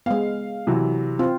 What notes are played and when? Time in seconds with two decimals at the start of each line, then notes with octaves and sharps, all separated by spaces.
0.06 G#3 B3 F5
0.67 C3 E3 F#3
1.19 C4 F4